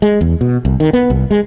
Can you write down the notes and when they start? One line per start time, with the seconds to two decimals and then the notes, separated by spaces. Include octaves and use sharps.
0.02 G#3
0.21 E2
0.41 B2
0.65 C2
0.80 D#3
0.93 B3
1.10 C2
1.31 G#3